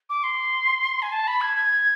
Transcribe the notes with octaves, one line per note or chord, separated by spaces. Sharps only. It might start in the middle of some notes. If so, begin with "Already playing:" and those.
D6
C6
G#5
A5
B5
G#6
G#6